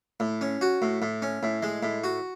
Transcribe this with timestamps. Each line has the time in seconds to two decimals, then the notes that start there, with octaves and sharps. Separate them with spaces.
0.20 A2
0.41 C#4
0.61 F#4
0.82 A2
1.02 A2
1.22 C#4
1.43 A2
1.62 G#3
1.83 A2
2.04 F#4